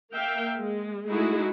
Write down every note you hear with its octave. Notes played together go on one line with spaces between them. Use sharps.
A#3 E5 F5 G5
G#3
G#3 A3 D#4 E4 F#4 G#4